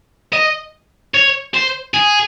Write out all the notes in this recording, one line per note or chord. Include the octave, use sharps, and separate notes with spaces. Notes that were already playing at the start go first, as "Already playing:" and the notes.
D#5
C#5
C5
G#4